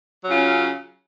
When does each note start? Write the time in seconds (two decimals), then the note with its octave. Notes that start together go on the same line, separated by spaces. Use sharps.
0.24 F#3
0.28 C#3
0.32 F4
0.35 C#4